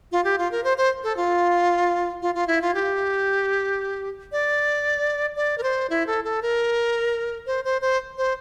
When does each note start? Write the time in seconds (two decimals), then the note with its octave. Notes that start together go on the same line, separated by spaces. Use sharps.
0.12 F4
0.24 G4
0.38 F4
0.51 A#4
0.64 C5
0.77 C5
1.04 A4
1.17 F4
2.22 F4
2.35 F4
2.47 E4
2.62 F4
2.75 G4
4.32 D5
5.36 D5
5.58 A#4
5.63 C5
5.90 E4
6.07 A4
6.24 A4
6.42 A#4
7.47 C5
7.65 C5
7.82 C5
8.18 C5